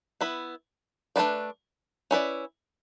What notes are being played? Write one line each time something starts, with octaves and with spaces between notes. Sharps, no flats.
B3 E4 B4
A3 D4 F#4 B4 D5
C#4 E4 B4 D5